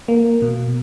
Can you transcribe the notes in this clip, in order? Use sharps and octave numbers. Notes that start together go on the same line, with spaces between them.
A#3
B2